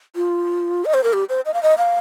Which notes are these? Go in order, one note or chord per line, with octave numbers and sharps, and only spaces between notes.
F4
D#5
C5
A#4
G4
C5
D#5
F5
D#5
F5